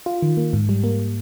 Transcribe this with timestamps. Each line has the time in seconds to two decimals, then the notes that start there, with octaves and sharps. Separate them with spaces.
0.06 F4
0.22 D#3
0.37 A#3
0.53 G#2
0.69 G3
0.84 A#3